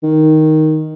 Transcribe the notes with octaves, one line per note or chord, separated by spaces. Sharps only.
D#3